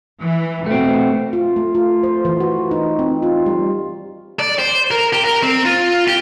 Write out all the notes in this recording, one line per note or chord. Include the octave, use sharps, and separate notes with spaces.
E3
B2 A3 C4
F4
A3
F4
C5
E3
F#4
D#4
C4
F4
G3
D5
C5
A#4
G4
A#4
C4
F4
G4